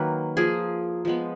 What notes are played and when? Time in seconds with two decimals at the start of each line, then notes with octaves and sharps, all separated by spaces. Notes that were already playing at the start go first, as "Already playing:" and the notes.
Already playing: D#3 F#3 A#3 B4
0.37 F3 A#3 G#4
1.05 F3 G#3 B3